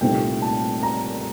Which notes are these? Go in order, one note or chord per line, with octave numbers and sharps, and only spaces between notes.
C2 A#2 A3 C4 D#4 G5
A5
A#5